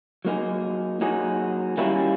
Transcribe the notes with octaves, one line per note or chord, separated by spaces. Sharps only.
F#3 A#3 D#4 G#4
F#3 A#3 D#4 G#4
D#3 G3 A#3 C#4 E4